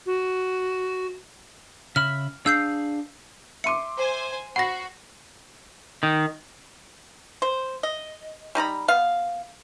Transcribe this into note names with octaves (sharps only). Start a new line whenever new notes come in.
F#4
C#3 E5 B5 F6
D4 G#4 F5 E6 G6 C7
E5 C6 D6 C#7 D#7
C5 G#5
F#4 F#5 B5 A#6 C7
D#3
C5
D#5
G3 D#4 A#5 B5
B3 F5